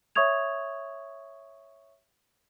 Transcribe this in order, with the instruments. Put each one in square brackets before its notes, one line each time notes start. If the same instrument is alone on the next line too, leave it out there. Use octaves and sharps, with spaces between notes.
[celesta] C#5 E5 C#6 D#6 G#6 F7